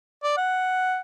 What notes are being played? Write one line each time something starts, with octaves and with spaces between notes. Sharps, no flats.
D5
F#5